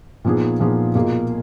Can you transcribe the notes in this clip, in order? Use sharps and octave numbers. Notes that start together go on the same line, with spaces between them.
A#2 F3 B3 D#4 G#4
A#2 F3 B3 D#4 G#4
B2 A#3 F4 G#4